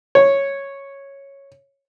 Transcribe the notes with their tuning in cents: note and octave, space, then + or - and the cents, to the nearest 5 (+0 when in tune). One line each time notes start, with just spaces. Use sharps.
C#5 -5